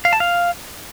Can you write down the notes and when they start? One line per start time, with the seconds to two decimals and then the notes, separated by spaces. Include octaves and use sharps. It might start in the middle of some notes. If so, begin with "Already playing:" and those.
0.05 F5
0.13 A5
0.20 F5